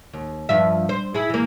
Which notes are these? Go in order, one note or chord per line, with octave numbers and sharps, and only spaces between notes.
D#2
G2 F3 E5
C5
E4 G#4
E3 A#3